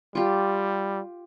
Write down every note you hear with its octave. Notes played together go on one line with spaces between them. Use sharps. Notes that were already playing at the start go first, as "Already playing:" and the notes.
G3 F4 G4